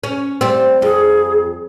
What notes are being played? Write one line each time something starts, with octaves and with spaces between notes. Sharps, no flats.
C#4
G3 C4
F2 G#4